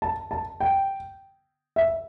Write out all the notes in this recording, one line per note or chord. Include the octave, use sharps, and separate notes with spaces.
A5
A5
G5
E5